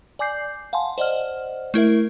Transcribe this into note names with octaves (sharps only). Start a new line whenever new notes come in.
D5 G#5 D6 G6 C7
F5 F#5 G#5 A5 C6
C5 D5 D#5 F#5 F6
A3 E4 A#4 E5